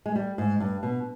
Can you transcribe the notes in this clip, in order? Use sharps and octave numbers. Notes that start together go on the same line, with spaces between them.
G#3
G3
G#2
G2
B2